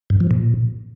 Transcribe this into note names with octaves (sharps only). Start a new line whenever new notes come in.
G2
F3
A#2